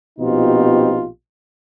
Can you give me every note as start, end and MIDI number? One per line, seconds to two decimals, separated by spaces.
0.19 1.06 34
0.19 1.06 47
0.19 1.06 60
0.19 1.06 63
0.19 1.06 65
0.19 1.06 67